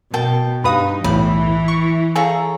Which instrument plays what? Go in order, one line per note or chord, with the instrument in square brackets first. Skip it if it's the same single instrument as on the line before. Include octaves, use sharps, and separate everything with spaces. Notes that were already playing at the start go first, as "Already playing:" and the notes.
[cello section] B2 [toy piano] A#4 [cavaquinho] G5 A5
[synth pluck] G2 B4 D#6 [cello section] D#4 [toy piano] G4 F5 B5
[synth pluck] B1 E2 A2 [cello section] E3 [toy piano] C#5 [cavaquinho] B5
[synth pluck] C#6
[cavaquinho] G#4 C#5 A#5 [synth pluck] A4 [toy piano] F5 G#5